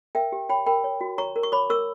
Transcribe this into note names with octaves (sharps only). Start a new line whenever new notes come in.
A#4 E5 G5
G4
C#5 G5 B5
A#4 G5 B5
C#5
F#4
C#5 A#5 C#6
A#4
C#6
C#5 B5 D6
A#4 C#6 E6